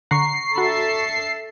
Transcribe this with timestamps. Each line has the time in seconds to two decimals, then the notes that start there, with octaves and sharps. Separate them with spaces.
0.11 D3 F#5 A#5 C#6 C7
0.56 D4 F#4 A4 E5 B5